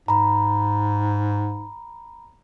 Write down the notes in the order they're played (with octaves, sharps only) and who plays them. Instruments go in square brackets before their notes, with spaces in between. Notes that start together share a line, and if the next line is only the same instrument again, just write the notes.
[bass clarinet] G#2 [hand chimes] A#5 B5